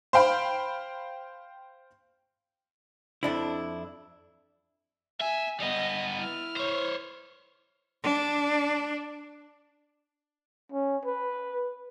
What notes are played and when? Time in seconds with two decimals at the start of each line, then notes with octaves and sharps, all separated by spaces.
0.13 C5 F5 G5 B5
3.23 F2 D4 E4
5.20 E5 G#5
5.60 G3 B3 D#5 D#6
6.18 E4 F6
6.56 C5 C#5
8.03 D4
10.72 C#4
11.05 B4